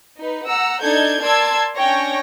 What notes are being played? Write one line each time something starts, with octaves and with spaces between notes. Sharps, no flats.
D#4 B4
F#5 A#5 E6
D4 D#4 A4 G6 G#6
A#4 D5 A5 C6 E6 G#6
C#4 D4 C#5 G5 A#6